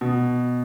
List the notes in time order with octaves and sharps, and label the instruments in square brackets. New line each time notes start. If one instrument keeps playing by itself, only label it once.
[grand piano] B2